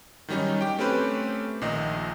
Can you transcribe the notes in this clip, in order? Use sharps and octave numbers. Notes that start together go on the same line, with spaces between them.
D#3 F#3 G3 C#4 D#4
G4 G5
A3 C4 C#4 G4 B4 C5
A#1 A#2 D#3 D#5